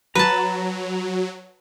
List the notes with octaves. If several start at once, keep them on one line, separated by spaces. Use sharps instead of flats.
F#3 B4 A5 A#5